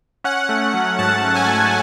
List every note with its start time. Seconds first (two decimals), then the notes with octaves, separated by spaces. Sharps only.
0.24 C#4 F#5
0.49 A3
0.74 F#3
0.98 G#2 A5
1.23 C#4
1.35 G#5
1.48 A3